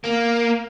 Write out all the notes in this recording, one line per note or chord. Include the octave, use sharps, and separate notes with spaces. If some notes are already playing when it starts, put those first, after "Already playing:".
A#3